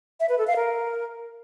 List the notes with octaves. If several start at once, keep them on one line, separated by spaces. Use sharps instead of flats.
E5
B4
A4
F5
A#4